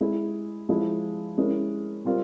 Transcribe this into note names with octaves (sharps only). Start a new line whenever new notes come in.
G#3 E4 G#4
F3 G#3 E4
G#3 C#4 E4 A#4
G3 C4 F4 A#4